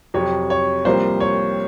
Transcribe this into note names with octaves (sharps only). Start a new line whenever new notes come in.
F2 C3 F#3 C#5
C#5
C2 C3 F3 A#3 C5
C#5